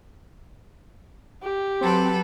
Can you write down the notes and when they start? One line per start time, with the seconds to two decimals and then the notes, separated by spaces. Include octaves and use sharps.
1.43 G4
1.81 F#3 C4 A4 B4